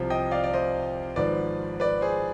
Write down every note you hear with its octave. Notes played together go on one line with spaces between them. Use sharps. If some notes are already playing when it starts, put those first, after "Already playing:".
Already playing: C2 C3 F3
D#5 G5
D5 F5
D5
C5 D#5
G#1 G#2 F3 B4 D5
B4 D5
G#4 C5